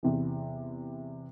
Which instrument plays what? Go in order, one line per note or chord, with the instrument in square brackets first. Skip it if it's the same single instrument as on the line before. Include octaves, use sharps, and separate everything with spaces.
[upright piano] E2 C3 E3